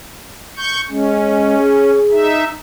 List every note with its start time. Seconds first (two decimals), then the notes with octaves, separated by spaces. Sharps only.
0.57 C#6 G6
0.89 G#3 C#4
1.57 G#4
2.12 D#4 E5